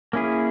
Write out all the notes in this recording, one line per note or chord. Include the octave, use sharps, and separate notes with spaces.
A#3 C#4 E4 G#4